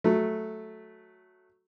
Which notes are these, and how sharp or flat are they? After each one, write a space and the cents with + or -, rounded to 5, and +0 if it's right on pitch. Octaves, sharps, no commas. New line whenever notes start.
F#3 +0 A3 -5